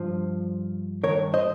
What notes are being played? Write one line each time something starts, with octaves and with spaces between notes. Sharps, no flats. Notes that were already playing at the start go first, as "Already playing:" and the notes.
Already playing: G2 F3
G2 D#3 A#4 C#5
C5 D#5